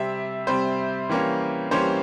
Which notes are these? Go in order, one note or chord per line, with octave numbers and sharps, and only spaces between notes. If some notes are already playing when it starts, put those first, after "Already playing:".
Already playing: C3 G3 C4 E5
C3 G3 C4 C5
E3 G3 A#3 C#4
E3 G3 A#3 C#4 C5